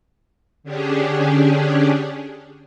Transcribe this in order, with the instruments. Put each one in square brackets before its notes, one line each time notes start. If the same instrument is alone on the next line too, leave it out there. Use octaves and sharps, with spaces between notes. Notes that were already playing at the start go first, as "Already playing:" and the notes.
[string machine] D3 C#4 D4 G4 G#4